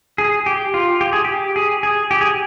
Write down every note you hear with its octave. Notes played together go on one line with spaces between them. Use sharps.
G#4
G4
F4
G4
G#4
G4
G#4
G#4
G4
G#4